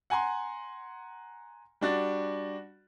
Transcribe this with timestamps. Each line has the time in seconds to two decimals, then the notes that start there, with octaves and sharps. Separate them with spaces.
0.10 F#5 G#5 A#5 C6
1.81 G3 D4 F#4 A6